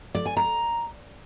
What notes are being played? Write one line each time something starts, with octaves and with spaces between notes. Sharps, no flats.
D5
G#5
A#5